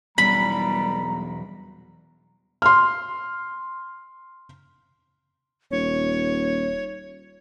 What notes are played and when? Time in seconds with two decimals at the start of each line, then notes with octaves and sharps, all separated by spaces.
0.18 E2 B2 F#3 G3 A#5 B5
2.62 C6 F6
5.71 D#1 C#5